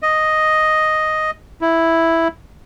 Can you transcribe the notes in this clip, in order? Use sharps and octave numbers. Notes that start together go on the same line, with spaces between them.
D#5
E4